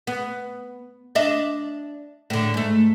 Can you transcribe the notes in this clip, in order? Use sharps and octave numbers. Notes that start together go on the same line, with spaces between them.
B3
D4 D#5 E5
A2 D3
G#2 A3